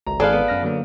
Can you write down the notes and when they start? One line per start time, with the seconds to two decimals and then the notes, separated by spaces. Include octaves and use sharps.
0.07 G#1 C#2 A#5
0.20 G#1 G#3 G#4 A4 B4 D5 F5
0.32 B3
0.48 F#2 F6 A#6
0.63 D3 F#3 A#3